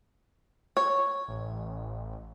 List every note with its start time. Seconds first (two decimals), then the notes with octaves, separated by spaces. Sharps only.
0.77 C#5
1.28 A1